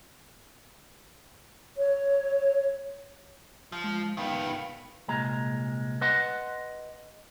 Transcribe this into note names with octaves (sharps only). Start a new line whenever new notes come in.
C#5
F3
G#3
D#3 B3 F5 G5
C2 A#2 G#3 A#5
B4 D#5 F#5 C6